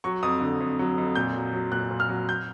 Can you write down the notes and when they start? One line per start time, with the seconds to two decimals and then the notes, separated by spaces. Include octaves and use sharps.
0.04 F#3 C#6
0.23 F2 D#6
0.41 D3
0.60 F2
0.79 F#3
0.98 F2
1.15 A#2 G6
1.35 F#3
1.53 F#3
1.72 A#2 F#6
1.91 A#2
2.00 F6
2.09 F#3
2.29 G6